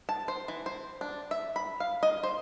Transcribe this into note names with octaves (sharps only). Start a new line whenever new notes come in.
A5
C5
E3
C5
D4
E5
B5
F5
D#5
C5